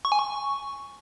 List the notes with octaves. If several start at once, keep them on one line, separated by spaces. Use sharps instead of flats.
C#6
G#5
C#6